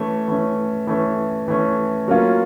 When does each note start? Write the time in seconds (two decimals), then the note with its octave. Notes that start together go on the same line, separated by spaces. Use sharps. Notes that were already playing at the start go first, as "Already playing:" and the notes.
Already playing: E3 A3 C#4
0.28 E3 A3 C#4
0.87 E3 A3 C#4
1.48 E3 A3 C#4
2.08 F#3 A#3 C#4 F4